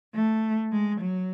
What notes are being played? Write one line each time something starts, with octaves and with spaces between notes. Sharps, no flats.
A3
G#3
F#3